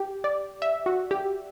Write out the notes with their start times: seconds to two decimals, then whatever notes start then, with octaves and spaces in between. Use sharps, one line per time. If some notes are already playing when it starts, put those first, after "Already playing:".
Already playing: G4
0.24 D5
0.62 E5
0.86 F#4
1.11 G4